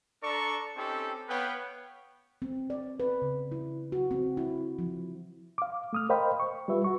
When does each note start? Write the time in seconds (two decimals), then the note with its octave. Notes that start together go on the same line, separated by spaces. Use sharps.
0.23 D4 A4 D5 A#5 C#6
0.76 C4 C#4 D#4 G4 A4
1.29 B3 B4 C#5 F5 G5
2.42 C4
2.70 D5
3.00 B4
3.22 C#3
3.52 E4
3.92 F#4
4.11 C4
4.37 E4
4.79 F3
5.58 F5 D6
5.93 A3 D#6 F6
6.09 A#4 C5 D#5 F5 G5 B5
6.40 C#6
6.68 G3 F4 B4 E5
6.84 F#4 C#6